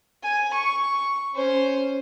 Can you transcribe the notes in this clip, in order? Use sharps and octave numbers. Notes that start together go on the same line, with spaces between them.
G#5
C#6
C#4 C5